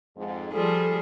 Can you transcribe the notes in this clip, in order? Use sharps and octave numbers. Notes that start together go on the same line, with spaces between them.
F2 G#2
F3 G3 G#4 A4